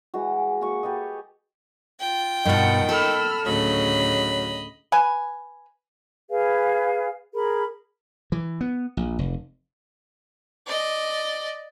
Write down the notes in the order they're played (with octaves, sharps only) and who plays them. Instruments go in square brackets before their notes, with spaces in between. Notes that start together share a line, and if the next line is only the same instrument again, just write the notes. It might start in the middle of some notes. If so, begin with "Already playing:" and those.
[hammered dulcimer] E3 G#3 F#4
A#3 F#4 D#5 C#6
G4 A4 B4 D#5
[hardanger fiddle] F4 G5
[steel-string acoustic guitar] G2 B2 [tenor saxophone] D#3 [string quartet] F#5 A5
[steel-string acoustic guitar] A4 [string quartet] B5 E6 F6
[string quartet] D2 A2 C#3 [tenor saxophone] F#3 [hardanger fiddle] D#5 B5
[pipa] B4 G#5
[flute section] G#4 B4 F5 G#5
G#4 A#4 B5
[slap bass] E3
B3
A#1
F1
[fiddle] D5 D#5